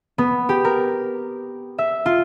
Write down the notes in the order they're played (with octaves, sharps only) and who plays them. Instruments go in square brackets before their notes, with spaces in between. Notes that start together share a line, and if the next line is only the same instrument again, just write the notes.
[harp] B3
G4
A#4
E5
F4